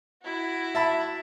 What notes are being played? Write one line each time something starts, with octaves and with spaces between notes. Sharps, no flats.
E4 F#4
E5 A5 B5